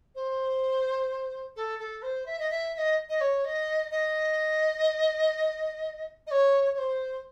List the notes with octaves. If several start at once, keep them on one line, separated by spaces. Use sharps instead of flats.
C5
A4
A4
C5
E5
D#5
E5
E5
D#5
D#5
C#5
D#5
D#5
D#5
C#5
C#5
C5